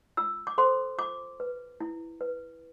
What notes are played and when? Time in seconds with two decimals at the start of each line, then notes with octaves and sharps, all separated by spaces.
0.17 F4 E6
0.47 D6
0.58 A4 C5 C6
0.98 F4 D6
1.40 B4
1.81 E4
2.21 B4